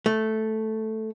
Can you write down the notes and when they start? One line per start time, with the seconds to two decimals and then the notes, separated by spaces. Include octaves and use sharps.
0.06 A3